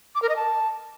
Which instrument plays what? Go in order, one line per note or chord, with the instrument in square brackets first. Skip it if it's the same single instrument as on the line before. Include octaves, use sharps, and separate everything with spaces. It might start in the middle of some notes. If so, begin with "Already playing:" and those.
[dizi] D6
A#4
D#5
A5